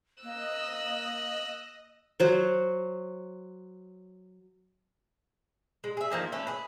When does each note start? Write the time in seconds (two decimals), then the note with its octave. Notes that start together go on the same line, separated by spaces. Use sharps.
0.23 A#3 D#5 E6 F#6
2.20 F#3 C5
5.84 G#3
5.97 G#4 E5
6.10 D3 D#3 F3 A#3
6.32 A3 C#4 B4
6.47 G#4 B4